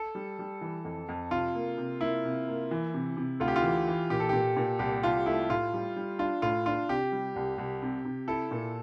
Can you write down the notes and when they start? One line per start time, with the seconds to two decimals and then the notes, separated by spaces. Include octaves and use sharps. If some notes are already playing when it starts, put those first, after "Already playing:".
Already playing: A4
0.15 G3
0.39 G3
0.61 E3
0.85 F2
1.09 F2
1.31 C3 F4
1.54 A#3
1.77 C3
2.00 A#3 E4
2.25 C3
2.48 A#3
2.71 E3
2.94 C3
3.17 C3
3.40 D2 F4
3.48 G4
3.56 F4
3.63 E3
3.87 E3
4.10 A#2 G4
4.20 A4
4.29 A#2 G4
4.57 A#2
4.79 C2 G4
5.03 C2 F4
5.26 A3 E4
5.50 A2 F4
5.73 G3
5.96 G3
6.19 D4 F4
6.42 A2 F4
6.66 D4 F4
6.88 C3 G4
7.12 G3
7.36 C2
7.58 C2
7.82 C3
8.05 C3
8.28 E4 A4
8.51 A#2